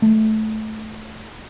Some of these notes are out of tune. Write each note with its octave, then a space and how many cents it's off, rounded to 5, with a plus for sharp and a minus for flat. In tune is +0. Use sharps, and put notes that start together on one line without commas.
A3 -15